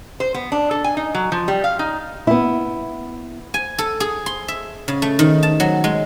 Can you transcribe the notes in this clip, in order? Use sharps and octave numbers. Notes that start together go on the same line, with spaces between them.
C5
B3
D4
A4
G#5
D#4
F#3
F3
G3
F5
D#4
B3 E4
G#5
A4
G#4
C6
E5
C#3
A3
D#3
A5
F#3
G#3